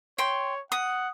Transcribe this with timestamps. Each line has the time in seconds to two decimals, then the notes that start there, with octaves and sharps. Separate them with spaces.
0.18 C#5 G5 C6
0.72 F#5 D#6